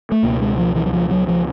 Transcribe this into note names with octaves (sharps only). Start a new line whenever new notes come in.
A3
C#2 B2 A#3
G#3
F3
E3
F#3
F3
F#3
F3